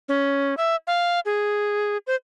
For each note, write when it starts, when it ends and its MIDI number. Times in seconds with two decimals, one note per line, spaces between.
0.09 0.54 61
0.57 0.76 76
0.87 1.20 77
1.26 1.97 68
2.07 2.15 72